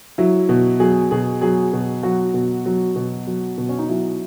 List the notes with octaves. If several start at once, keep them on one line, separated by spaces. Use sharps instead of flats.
F#3 E4
B2
F#3 G#4
B2 G#4
F#3 G#4
B2
F#3 F#4
B2
F#3
B2
F#3
B2
C#4
D#4
F#3 E4